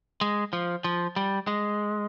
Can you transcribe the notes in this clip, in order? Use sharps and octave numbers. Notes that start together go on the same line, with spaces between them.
G#3
F3
F3
G3
G#3